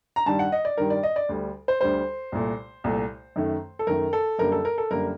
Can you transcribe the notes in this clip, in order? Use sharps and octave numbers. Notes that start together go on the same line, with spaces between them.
A#5
G2 D#3 G3 A5
F#5
D#5
D5
G2 D#3 G3 A#4
D5
D#5
D5
D2 D3 G3
C5
D2 D3 G3 C5
C2 A#2 A3
C2 A#2 A3
F#2 D#3 A3
A4
F#2 D#3 A3 A#4
A4
F#2 D3 G3 A#3 A#4
A4
A#4
A4
F#2 D3 G3 A#3 A#4